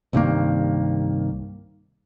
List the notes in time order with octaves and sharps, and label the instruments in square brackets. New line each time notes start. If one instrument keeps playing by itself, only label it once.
[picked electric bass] C2 G2 D#3 A#3